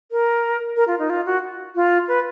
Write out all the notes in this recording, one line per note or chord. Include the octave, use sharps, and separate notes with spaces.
A#4
A#4
F4
D#4
F4
F#4
F4
B4